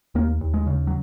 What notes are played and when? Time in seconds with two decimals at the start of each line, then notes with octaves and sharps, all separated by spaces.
0.15 D#2 A#3
0.41 D#2
0.54 G#3
0.67 C#3
0.87 F#3